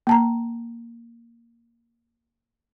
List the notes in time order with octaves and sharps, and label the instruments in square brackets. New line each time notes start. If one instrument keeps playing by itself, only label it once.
[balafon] A#3 A5 A#5